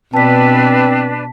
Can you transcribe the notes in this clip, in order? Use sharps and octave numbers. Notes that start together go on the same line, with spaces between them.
B2 C4 D4 B4 A5 B6